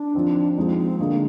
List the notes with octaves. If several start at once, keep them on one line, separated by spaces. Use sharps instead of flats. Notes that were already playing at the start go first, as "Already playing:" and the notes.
Already playing: D4
F3 C4 D#4
F3 G#3 C4 D#4
C4
D3 G#3 A#3 D#4